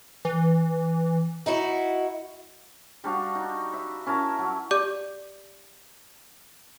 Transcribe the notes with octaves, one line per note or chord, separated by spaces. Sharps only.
E3
D#4 E4 F#4
G3 D4 F#4 F5
D#4
E5
C#4 E4 A#4 A5
F#3
G4 D5 D6 G6